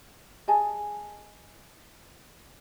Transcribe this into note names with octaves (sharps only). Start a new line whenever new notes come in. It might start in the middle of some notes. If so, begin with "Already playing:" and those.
G#4 D#5 G#5 A5